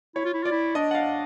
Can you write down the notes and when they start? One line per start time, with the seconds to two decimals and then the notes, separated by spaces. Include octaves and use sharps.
0.15 E4 C#5
0.25 F4
0.34 E4
0.43 F4 D5
0.51 E4
0.75 D4 D#5
0.91 F#5
0.95 F5